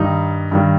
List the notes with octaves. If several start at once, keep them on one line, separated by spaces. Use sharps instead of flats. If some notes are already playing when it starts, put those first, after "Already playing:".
Already playing: G2 D#3 G3 D#4
G2 D#3 G3